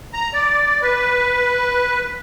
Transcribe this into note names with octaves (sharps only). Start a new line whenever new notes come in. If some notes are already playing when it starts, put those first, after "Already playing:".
A#5
D5
B4